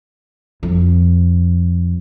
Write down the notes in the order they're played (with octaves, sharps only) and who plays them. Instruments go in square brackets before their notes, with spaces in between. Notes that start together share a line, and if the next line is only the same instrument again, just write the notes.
[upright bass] F2